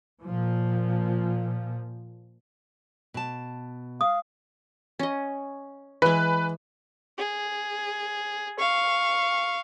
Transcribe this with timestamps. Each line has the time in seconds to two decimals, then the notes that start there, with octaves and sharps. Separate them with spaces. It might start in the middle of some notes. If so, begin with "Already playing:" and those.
0.23 A#2 F3
3.14 B2 A5
4.01 F5 D#6
4.99 C#4 D#5
6.02 E3 G#3 B4
7.18 G#4
8.58 F5 C#6